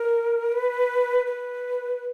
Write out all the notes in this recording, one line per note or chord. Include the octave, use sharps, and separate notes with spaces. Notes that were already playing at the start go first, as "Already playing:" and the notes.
Already playing: A#4
B4
B4